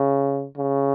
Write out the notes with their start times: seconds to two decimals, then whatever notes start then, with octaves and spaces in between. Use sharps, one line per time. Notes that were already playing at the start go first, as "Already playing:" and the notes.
Already playing: C#3
0.58 C#3